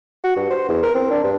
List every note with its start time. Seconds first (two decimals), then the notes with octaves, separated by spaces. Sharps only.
0.24 F#4
0.37 G2
0.51 C5
0.69 E2
0.83 A#4
0.95 C4
1.11 D4
1.24 G2